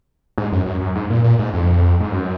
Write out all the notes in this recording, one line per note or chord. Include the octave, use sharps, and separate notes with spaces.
G#2
F#2
F#2
F#2
G#2
A#2
A#2
G#2
F2
G#2
F#2